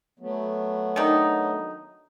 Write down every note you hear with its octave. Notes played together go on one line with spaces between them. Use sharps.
F#3 A3 B3
D#3 D4 D#4